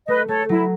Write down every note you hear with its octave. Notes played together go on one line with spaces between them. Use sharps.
A3 B4 D#5
A3 A4 C#5
F#3 E4